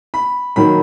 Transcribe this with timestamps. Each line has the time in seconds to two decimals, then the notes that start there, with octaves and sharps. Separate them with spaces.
0.14 B5
0.56 D#3 F#3 A#3 B5